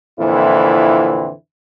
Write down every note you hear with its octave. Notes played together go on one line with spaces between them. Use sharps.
F2 A#2 D3 E3 C4 E4